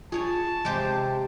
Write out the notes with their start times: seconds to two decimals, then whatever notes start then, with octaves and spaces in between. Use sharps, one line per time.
0.12 F4 G#4 C#5 G#5 A5
0.65 C3 G#3 G4 C5